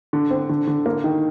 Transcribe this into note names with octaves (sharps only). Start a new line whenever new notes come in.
D3
C4
D3
D3
A#3
D#3